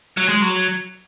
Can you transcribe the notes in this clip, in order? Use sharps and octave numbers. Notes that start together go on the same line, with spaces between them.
F#3
G#3
F#3